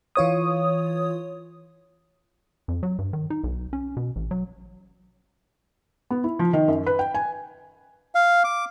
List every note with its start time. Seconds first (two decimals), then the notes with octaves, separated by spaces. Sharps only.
0.16 E3 F4 C#5 D#6
2.68 F2
2.83 F#3
2.99 G2
3.13 D#3
3.30 D#4
3.44 B1
3.73 C#4
3.97 B2
4.16 A1
4.31 F#3
6.10 B3
6.24 E4
6.39 F3
6.53 D#3
6.68 F#2
6.86 B4
6.99 G5
7.14 G#5
8.15 F5
8.44 D6